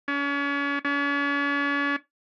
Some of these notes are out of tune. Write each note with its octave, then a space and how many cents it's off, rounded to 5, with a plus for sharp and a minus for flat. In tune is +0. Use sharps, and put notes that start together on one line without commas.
C#4 +35
C#4 +40